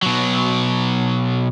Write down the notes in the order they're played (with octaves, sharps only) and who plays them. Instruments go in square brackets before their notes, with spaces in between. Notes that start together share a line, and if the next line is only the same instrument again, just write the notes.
[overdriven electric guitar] B2 F#3